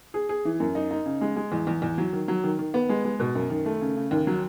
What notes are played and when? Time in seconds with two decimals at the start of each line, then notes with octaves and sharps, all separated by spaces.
0.14 G#4
0.29 G#4
0.45 E3
0.60 F#2
0.75 D#4
0.91 D#4
1.06 C#3
1.21 G#3
1.36 G#3
1.52 E2
1.67 E2
1.82 E2
1.98 F#3
2.13 D#3
2.28 F#3
2.44 D#3
2.59 D#3
2.74 B3
2.89 G#3
3.05 G#3
3.20 B2
3.35 F#2
3.50 D#3
3.66 A3
3.81 C#3
3.96 C#3
4.11 D#2
4.27 F#3